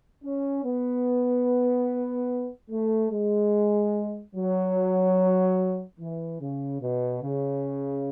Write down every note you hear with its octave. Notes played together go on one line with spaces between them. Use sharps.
C#4
B3
A3
G#3
F#3
E3
C#3
B2
C#3